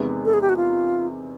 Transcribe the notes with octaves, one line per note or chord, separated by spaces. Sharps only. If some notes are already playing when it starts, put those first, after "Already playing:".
Already playing: E2 C3 D#3 G#3 B3
A4
G#4
G4
F#4
F4